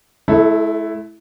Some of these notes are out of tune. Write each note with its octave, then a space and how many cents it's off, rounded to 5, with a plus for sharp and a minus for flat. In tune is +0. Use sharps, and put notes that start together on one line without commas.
A3 -45 E4 +0 A4 +5